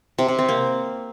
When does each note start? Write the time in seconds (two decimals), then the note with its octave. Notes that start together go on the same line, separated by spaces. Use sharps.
0.18 C3
0.28 C3
0.39 C4
0.49 A#3